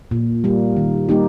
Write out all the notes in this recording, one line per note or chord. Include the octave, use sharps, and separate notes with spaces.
A#2
G3 A#3
D#3
G3 A#3 D#4 G4